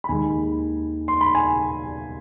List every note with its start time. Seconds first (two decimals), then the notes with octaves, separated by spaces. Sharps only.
0.04 B5
0.09 D#2 D#3 G#3 G#5
1.08 C6
1.21 B5
1.35 G#5